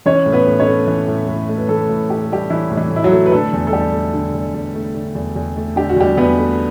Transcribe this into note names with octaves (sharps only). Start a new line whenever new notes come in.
E3 C#4 C#5
A2
B3 B4
A2
C#4 C#5
A3
E3
A2
A2
A3
B4
E3 A3 A4
A2
A2 G4
A4
G3 A3 G4
E3 E4
A2
E3 E4
A2
E4
F#3 F#4
A3
B4
D3 A3 A4
E2
A4
E2 G3 G4
A3
D3
E2
E2
A3
D3
E2
E2
A3
D3 G4
F#4
E2 G3 G4
E2 B3 B4
A3